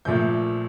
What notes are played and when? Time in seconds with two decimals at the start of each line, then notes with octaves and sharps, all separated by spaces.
0.05 A#1 A#2 F3 A3 G6